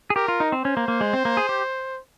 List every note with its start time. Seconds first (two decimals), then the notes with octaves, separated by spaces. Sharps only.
0.10 G#4
0.16 G4 A#4
0.28 F4
0.40 D#4
0.52 C4
0.64 C#4 C5
0.77 A#3
0.88 A#3
1.01 G#3
1.13 C4
1.25 A#3
1.37 G#4
1.49 G4